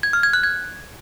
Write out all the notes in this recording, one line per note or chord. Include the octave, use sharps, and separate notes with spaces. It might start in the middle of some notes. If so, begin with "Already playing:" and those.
G#6
F6
G#6
F#6
G#6